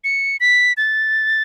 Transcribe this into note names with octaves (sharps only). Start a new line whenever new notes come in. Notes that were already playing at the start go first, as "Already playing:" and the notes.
C#7
B6
A6